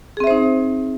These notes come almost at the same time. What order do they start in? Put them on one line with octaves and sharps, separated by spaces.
G#4 C4 E5 C5 D#4